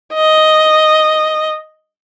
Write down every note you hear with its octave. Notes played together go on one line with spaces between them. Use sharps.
D#5